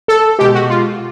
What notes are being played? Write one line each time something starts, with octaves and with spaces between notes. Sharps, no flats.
A4
B2 G#3 G4
F#4
F4